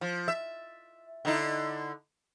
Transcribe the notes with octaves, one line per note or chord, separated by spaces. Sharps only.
F3
E5
D3 D#4 E4